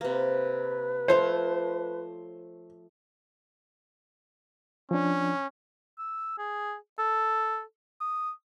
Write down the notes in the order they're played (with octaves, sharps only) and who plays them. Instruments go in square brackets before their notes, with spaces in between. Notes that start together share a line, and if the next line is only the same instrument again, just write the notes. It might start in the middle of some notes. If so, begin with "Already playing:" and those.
[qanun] C3 A#3 [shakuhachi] B4
[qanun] F3 A3 C#5 [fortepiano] C5
[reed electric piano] F3 D4 [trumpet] C#4
[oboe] E6
G#4
A4
D#6